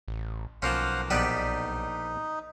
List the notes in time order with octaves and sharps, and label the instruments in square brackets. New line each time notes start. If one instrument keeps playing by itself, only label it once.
[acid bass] A1
[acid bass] B1 [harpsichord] F3 A#3 C#4 [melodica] C5 F5 F#5
[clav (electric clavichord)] A#1 D5 F#5 [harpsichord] G3 B3 B4 [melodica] D#4